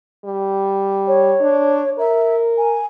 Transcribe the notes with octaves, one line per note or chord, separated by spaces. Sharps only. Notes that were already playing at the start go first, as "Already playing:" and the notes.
G3
C#5
D4
A#4 E5
G#5